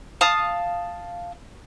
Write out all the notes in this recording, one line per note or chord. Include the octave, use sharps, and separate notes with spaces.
F5 A5 D#6